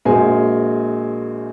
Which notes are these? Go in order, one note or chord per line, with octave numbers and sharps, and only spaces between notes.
A#1 G#3 A#3 F#4 C5 G#5